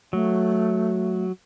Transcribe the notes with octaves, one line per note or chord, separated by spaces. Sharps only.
F#3 A3